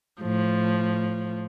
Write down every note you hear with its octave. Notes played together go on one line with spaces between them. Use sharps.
A2 F3